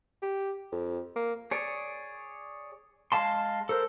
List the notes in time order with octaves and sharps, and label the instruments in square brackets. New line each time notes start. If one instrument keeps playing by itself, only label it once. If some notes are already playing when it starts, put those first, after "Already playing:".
[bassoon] G4
F2
A#3
[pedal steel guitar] G#4 C#5 D5
G#3 F5 A5 C6
A4 A#4 C5